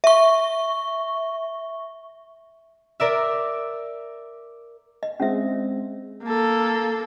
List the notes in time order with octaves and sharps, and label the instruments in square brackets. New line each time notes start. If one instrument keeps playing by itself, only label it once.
[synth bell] E5 C#6
[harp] A#4 D5 E5
[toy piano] D#5
[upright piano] G#3 C4 [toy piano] C#4 E5
[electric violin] A#3 A4